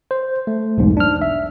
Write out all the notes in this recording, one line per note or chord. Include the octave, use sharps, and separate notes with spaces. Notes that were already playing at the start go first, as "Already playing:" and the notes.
C5
A3
B1 E2 G#2
D4 F6
E5